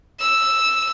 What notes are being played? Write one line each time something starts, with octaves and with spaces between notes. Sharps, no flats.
E6 E7